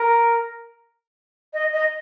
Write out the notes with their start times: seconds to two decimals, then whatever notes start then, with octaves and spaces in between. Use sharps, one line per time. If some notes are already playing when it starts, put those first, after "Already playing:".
Already playing: A#4
1.54 D#5
1.73 D#5